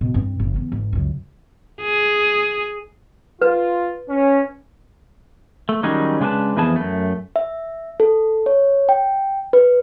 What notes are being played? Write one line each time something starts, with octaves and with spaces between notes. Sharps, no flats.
B2
G2 C4
F#1
E3 B3
G#1
C#2 F#2
G#4
F4 B4
C#4
A3
D#3 F#3 G3 C#4 D#4 G#4
C#3 G#3 D4 B4 A5
F2 E3 B3 G#4 A5
F#2 A3
E5
A4
C#5
G5
B4